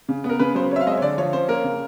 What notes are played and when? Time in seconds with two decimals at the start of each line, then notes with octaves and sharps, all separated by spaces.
0.09 C#3
0.24 B3
0.29 A#4
0.39 C#3 B4
0.55 F#3 C5
0.71 C4 C#5 E5
0.81 F5
0.86 G#3 D#5
0.92 E5
0.97 C#5
1.02 D3 D5
1.18 F3 C#5
1.33 C#4 C5
1.48 A#3 A#4
1.64 C#3